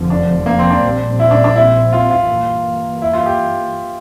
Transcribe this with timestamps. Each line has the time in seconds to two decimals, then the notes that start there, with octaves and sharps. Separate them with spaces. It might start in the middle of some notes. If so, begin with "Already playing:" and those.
Already playing: F1 F2 D3 F3
0.10 D4
0.46 A#3
0.59 C4
0.71 D4
0.83 A#1 A#2 G3 C4
1.19 E4
1.31 D4
1.44 D4
1.56 E4
1.93 F4
2.11 F4
2.28 G2 E3 A#3
3.02 E4
3.13 F4
3.26 G4